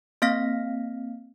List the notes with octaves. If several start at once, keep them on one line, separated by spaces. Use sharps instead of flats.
A#3 C4 F5 F6 A#6 B6